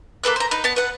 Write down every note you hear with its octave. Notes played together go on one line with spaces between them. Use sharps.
A#3 A4 B4 F#6
C5 A#5
D#4 B4
B3 A5
B4 F#5